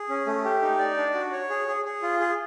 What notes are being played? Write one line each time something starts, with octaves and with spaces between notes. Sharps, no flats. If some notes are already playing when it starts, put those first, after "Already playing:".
Already playing: G#4
C#4
A3
G4
D#4
D5
D4
F#4
C#5
G#4
G#4
G#4
F4
G#4